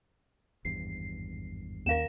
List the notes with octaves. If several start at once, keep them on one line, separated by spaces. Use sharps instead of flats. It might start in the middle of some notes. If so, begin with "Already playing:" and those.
G#1 E2 G2 C7
D#2 C#4 A#4 F5 E7